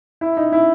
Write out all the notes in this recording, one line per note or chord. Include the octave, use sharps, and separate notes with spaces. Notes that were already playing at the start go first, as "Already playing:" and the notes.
E4
D#4
E4